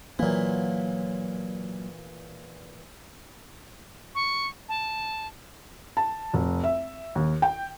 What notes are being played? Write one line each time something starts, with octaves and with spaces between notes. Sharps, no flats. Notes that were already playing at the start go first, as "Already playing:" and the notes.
A#2 E3 F#3 A#3
C#6
A5
A5
F1
E5
D#2
G5